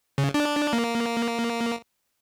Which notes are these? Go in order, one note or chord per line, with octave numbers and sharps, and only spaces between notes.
C#3
D4
A#3